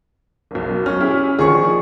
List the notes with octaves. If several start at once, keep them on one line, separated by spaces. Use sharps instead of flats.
F#1 B1
C#4 F6
E4 G4 G#4
A#1 D#3 F3 G#4 C#6